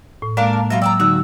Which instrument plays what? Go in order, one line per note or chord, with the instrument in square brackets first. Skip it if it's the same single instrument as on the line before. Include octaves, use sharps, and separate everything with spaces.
[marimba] A2
[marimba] G#3 A#3 [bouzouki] D4 A#4 F5
[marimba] A5 A#5
[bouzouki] B2 F4 E5 [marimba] F#3 A#6
[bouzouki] D5 A5 A#5 [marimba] G5 [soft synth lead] E6
[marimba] D3 F#3 D#4 [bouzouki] F#4